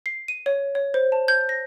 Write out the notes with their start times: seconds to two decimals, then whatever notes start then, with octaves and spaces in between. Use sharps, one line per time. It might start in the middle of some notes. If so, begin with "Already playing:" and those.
0.06 C7
0.28 D#7
0.46 C#5
0.75 C#5
0.94 C5
1.12 A5
1.28 G6
1.49 A#6